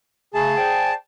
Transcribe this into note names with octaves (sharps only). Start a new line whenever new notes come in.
C#3 A3 G#4 A5
C5 D5 G5